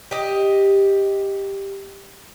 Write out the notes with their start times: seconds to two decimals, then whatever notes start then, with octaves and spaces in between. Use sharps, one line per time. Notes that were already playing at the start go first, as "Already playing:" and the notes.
0.11 G4 D#5